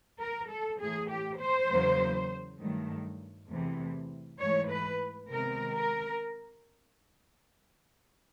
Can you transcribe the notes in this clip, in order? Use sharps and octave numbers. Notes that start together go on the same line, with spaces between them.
A#4
A4
A2 E3 A3 G#4
G4
C5
E2 C#3 F#3 A#3
G2 D#3 F#3 A3
E2 C3 E3 A3
G#2 E3 A3 C#5
B4
C3 D#3 G#3 B3 A#4
A#4